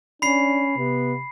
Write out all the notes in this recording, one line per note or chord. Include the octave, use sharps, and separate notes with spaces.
C#4 D4 B5 C7
C3 B3